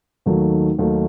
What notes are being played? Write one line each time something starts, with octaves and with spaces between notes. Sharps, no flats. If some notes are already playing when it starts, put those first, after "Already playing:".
D#2 D#3 F#3 A3
D#2 D#3 F#3 A3